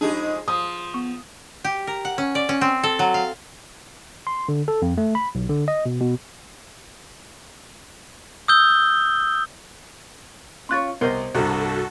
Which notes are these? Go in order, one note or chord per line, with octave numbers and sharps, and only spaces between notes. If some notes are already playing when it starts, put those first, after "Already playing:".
F2 G#3 D4 D#4 G4 G#4
F3 C6 D#6
B3 C#6
G4
A#4
F#5
C#4
D5
C#4
C4
A4
F#3
F5
C6
D3
A4
F2
A3
B5
B1
D3
D#5
B2
B2
D#6 E6 G6 G7
C#4 F4 C#5 C6 F#6 A6
C2 B3 A#4 C5 D#5
C2 G2 F#4 A4